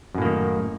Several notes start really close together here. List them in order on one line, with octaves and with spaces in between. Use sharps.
F#2 A2 A#3 D#3